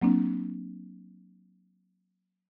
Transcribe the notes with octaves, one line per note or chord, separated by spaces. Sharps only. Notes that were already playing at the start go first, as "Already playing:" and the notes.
F#3 A#3 C4 D4